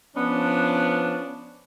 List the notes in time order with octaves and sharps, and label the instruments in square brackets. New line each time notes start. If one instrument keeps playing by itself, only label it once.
[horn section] F3 B3 C#4 D4